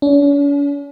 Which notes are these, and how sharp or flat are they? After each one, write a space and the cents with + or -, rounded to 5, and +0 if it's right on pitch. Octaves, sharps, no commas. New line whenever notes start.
C#4 +45